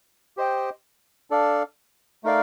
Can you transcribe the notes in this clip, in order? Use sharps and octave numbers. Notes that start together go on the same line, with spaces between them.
G4 C5 D#5 G5
D4 A4 D5 F5
A3 D#4 A#4 D5 F5